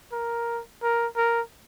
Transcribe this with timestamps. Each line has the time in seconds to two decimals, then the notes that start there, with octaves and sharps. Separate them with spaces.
0.12 A#4
0.82 A#4
1.17 A#4